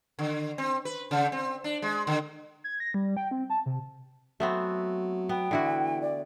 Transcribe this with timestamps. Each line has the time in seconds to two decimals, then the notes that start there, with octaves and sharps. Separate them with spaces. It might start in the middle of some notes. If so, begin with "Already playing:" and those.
0.19 D3
0.58 C4
0.85 B4
1.11 C#3
1.32 C4
1.64 D4
1.82 G#3
2.07 D3
2.64 G#6
2.80 A#6
2.94 G3
3.17 G5
3.31 C4
3.50 A5
3.66 C3
4.40 F#3 A3 B3 C4
5.29 B3 G5
5.51 D3 E3 E4 F#4
6.02 D5